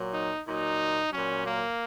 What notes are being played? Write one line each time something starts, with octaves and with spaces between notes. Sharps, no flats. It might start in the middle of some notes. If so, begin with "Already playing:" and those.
Already playing: A#2 F#3
D#4
A#2 F#3 D#4
A#2 F#3 C#4
A#3